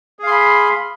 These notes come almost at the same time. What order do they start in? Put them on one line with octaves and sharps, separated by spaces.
G#4 F5 C6 B5